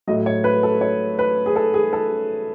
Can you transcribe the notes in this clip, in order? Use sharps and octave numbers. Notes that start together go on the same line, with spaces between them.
A2 F#3 D#5
C#5
B4
A4
C#5
B4
G#4
A4
G#4
A4